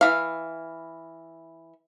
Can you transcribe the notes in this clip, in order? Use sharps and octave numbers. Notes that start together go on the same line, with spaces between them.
E3 F5